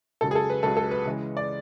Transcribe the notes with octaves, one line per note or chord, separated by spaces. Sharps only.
C#2 C#3 F#3 A4
G#4
A4
B4
C#2 C#3 F#3 A4
A4
B4
C#3 E3 G#3
D5